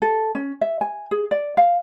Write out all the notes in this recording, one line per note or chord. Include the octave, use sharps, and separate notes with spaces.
A4
C#4
E5
G#5
G#4
D5
F5